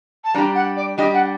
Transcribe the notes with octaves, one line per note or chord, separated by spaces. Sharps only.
A5
G3 D4 G4 A#5
F#5
D5
G3 D4 G4 D#5
F#5